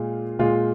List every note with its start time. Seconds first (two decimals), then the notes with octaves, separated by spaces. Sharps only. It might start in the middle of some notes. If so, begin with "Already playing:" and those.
Already playing: A#2 G#3 F4
0.39 A#2 G#3 F4